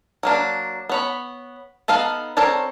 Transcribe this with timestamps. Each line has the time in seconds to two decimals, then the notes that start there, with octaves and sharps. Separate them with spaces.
0.23 F#3 A#3 D4
0.89 B3 C#5 B5
1.88 B3 D#4 A4 F5
2.37 C4 A4 A#4 C#5 D5